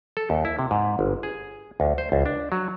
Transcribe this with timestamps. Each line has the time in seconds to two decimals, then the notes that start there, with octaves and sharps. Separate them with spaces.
0.17 A4
0.30 D#2
0.45 E4
0.59 C3
0.71 G#2
0.99 G1
1.23 G#4
1.80 D2
1.98 C5
2.12 C#2
2.26 D4
2.52 F#3